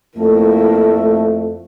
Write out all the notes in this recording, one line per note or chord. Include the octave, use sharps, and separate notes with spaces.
F2 A3 A#3 E4 A4